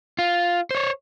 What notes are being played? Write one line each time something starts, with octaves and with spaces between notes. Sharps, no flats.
F4
C5 C#5